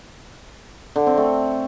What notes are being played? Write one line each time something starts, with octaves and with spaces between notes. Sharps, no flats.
D3
C4
A3